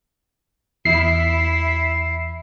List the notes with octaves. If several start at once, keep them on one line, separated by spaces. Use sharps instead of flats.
E2 E4 C7